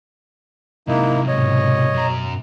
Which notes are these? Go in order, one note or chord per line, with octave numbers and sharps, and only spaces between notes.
C3 G#3 A#3 D#4 E4
G#2 B2 C#5 D#5
F#2 A#5